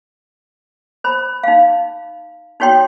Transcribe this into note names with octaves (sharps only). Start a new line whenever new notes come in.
C5 B5
D#4 F5
D#4 F#4 C#5 G5 C6